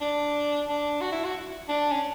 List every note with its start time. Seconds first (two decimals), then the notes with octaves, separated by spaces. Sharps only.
0.01 D4
0.68 D4
1.01 F#4
1.12 E4
1.24 F#4
1.68 D4
1.91 C#4